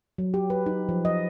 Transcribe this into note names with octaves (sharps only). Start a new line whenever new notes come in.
F#3
G4
B4
D#4
F3
D#5